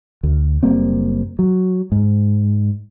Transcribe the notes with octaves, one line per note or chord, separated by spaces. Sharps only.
D2
F#1 G3 A#3 C4
F#3
G#2